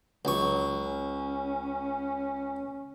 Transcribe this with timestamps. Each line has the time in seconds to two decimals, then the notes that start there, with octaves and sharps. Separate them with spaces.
0.25 C#2 F#3 C#6
0.85 C#4